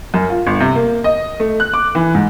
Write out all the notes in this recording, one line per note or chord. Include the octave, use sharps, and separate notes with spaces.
F#2
F4
G1
C3
A#3
D#5
A3
F#6
D6
E3
G#2